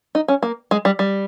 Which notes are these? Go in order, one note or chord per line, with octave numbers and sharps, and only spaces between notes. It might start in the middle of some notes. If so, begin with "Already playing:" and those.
D#4
C#4
A#3
G#3
G3
G3